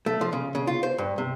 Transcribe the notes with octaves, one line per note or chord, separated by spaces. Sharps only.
A3
F3
C#3
C#3
F4
C5
G2
C3